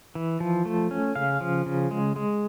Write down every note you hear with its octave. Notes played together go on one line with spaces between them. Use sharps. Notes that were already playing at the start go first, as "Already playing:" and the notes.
E3
F3
A3
C#4
C#3 F5
F3
C#3
G#3
G#3